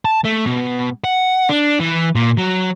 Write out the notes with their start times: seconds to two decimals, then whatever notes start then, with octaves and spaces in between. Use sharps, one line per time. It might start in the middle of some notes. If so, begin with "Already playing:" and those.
0.05 A5
0.25 A3
0.46 B2
1.04 F#5
1.49 D4
1.80 E3
2.15 A#2
2.38 F#3